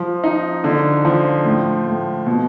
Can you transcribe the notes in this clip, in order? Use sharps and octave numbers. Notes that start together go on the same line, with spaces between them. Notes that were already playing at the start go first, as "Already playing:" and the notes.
Already playing: F3
D#4
D3
F3
A2
A2
B2